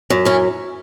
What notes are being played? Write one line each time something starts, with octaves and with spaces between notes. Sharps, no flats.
F#2
E3 C#4